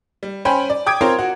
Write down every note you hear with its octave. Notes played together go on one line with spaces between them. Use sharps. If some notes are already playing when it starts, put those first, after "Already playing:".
G3
C#4 C5 G5 G#5 B5
D5
G5 D6 D#6 G#6 D7
C4 F4 A#4 C5 C#5 G5
F#4